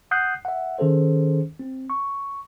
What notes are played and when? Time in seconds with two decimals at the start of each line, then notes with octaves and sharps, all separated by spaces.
0.11 F#5 D#6 F#6 G6 C7
0.45 E5 F#5
0.78 D#3 C#4 G#4 A4 C5
1.59 C4
1.90 C#6